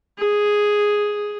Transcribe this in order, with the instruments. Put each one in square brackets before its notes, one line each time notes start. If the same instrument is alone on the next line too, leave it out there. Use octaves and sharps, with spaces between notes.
[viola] G#4